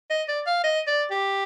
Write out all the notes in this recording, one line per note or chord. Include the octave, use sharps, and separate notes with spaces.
D#5
D5
F5
D#5
D5
G4